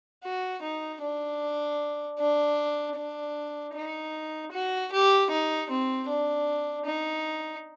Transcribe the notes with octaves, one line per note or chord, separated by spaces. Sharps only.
F#4
D#4
D4
D4
D4
D#4
F#4
G4
D#4
C4
D4
D#4